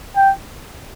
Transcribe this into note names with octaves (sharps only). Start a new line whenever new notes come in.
G5